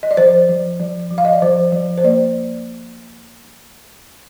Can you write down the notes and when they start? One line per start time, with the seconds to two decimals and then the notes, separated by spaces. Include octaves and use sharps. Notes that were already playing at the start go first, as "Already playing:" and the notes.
0.03 D#5
0.11 D5
0.17 F3 C5
0.49 F3
0.80 F3
1.11 F3
1.18 F5
1.25 D#5
1.33 D5
1.42 F3 C5
1.72 F3
1.98 C5
2.04 A#3 D5